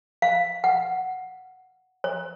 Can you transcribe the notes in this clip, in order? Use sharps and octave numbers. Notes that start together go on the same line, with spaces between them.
F5
F#5
C#5